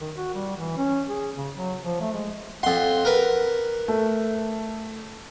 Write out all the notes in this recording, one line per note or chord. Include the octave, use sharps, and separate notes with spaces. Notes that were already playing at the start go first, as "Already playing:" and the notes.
D#3
F#4
G3
E3
C#4
G#4
C#3
F#3
F3
A3
G#3
F2 F#5 C6
A#4 B4
A3